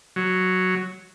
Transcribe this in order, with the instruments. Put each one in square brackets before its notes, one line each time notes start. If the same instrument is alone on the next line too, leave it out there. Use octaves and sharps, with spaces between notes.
[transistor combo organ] F#3